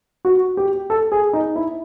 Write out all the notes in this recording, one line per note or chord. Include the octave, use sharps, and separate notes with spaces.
F#4
G4
A4
G#4
D#4
E4